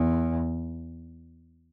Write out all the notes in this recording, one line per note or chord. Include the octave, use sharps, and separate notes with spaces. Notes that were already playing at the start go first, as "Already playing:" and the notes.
Already playing: E2